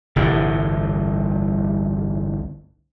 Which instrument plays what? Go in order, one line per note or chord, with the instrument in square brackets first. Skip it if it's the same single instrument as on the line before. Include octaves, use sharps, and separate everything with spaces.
[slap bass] G1 C2 A2 E3